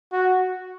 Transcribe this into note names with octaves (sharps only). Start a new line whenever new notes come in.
F#4